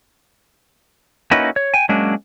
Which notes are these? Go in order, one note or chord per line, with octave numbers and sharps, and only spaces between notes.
A#3 C#4 D#4 E4 F#4 B4
C#5
G5 G#5
F#3 G#3 A#3 C#4 D4